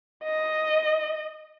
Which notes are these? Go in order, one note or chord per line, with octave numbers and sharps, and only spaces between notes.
D#5